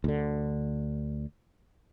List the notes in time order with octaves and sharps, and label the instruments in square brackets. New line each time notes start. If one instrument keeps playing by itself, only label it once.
[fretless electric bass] D2 D3